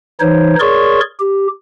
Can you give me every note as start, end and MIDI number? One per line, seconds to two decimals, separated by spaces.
0.20 0.55 52
0.20 0.55 63
0.20 0.55 72
0.20 0.55 73
0.60 1.00 68
0.60 1.00 70
0.60 1.00 73
0.60 1.00 74
0.60 1.00 84
0.60 1.00 85
1.20 1.47 67